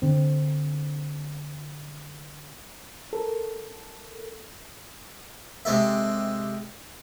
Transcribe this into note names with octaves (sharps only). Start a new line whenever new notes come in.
D3 C4
A4 A#4
C3 G#3 A4 E5